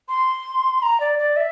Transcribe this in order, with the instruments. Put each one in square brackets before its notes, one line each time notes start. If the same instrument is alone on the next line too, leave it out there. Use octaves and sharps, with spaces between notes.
[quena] C6
A#5
D5
D5
E5